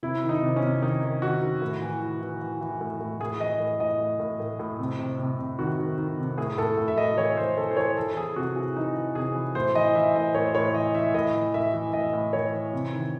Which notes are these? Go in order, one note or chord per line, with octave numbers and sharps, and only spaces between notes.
C3 E4
D#3
D#4
C3
C#4
C3
D#3 D#4
D#3
D#3 F#4
D#3
A2
E3
E3
E3
E3
E3
A2
A2
A2 G#4
E3 D#5
A2
A2 D#5
A2
A2
A2
A2
C3
C3
C3
C3
D#3 F#4
D#3
D#3
C3
A2 G#4
A2 A4
A2
E5
A2 D#5
E3 C#5
A2 C5
E3 A4
C5
E3 C#5
E3 A4
E3 G#4
C3 F#4
E3 G#4
E3 D#4
E3
C3 G#4
E3
A2 C5
E3 D#5
E3 E5
A2 D#5
A2 C#5
A2 C#5
E3 D#5
E3 E5
A2 D#5
E3
A2 E5
E3
A2 D#5
A2
E3 C#5
E3
C3
D#3